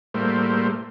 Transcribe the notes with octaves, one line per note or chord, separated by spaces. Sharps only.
A2 G3 A3 A#3 C5